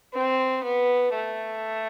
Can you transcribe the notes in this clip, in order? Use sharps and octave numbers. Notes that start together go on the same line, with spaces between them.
C4
B3
A3